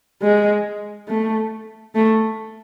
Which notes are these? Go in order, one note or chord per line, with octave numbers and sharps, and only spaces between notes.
G#3
A3
A3